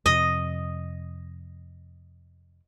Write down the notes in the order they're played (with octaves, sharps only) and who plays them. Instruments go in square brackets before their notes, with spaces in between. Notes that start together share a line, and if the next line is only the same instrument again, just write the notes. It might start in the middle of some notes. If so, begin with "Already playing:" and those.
[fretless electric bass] F2 C3 [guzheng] D#5